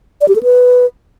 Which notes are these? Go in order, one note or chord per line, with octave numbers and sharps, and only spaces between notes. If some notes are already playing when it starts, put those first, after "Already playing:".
D5
G4
A4
B4